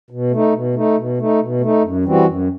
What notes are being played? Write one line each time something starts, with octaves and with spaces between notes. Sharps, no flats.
B2
A3 D#4
B2
A3 D#4
B2
A3 D#4
B2
A3 D#4
F#2
E3 G3 C4 F#4
F#2